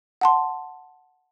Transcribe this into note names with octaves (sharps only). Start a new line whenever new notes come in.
F#5 A5 C6